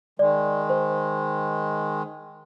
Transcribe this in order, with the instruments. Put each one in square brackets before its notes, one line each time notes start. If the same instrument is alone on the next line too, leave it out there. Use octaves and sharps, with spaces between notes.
[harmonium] D#3 G#3 [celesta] D5
[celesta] C5